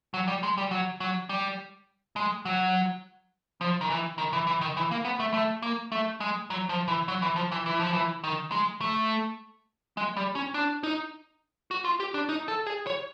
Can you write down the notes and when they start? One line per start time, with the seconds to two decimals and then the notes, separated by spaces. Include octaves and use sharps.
0.14 F#3
0.28 G3
0.43 G#3
0.57 G3
0.71 F#3
1.00 F#3
1.29 G3
2.16 G#3
2.45 F#3
3.61 F3
3.81 D#3
3.90 E3
4.18 D#3
4.33 E3
4.47 E3
4.61 D#3
4.77 E3
4.91 A#3
5.05 B3
5.20 A3
5.34 A3
5.62 A#3
5.92 A3
6.20 G#3
6.50 F#3
6.69 F3
6.88 E3
7.08 F#3
7.22 E3
7.36 F3
7.52 E3
7.66 E3
7.80 F3
7.93 E3
8.24 D#3
8.52 G#3
8.81 A3
9.97 G#3
10.17 G3
10.35 C#4
10.54 D4
10.83 D#4
11.71 F#4
11.85 F4
12.00 G4
12.14 D4
12.29 D#4
12.48 A4
12.67 G#4
12.87 C#5